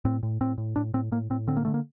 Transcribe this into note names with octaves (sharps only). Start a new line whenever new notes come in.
A2 C4
A2
A2 C4
A2
A2 D4
A2 C4
A2 A#3
A2 C4
D3 C4
A#3
D3 A3
A#3